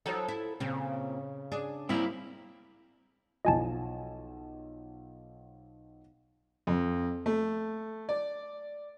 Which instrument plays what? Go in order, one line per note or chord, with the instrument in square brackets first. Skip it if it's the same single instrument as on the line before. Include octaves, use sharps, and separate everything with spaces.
[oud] F3 F#3 D#4 [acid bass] A4
[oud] E4
[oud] A#2 C4 [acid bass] C#3
[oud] D4 G#4
[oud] G3 A#3 [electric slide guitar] C4 E4
[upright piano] B1 F3 [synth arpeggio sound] D#5 G#5 A5
[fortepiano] F2
A3
D5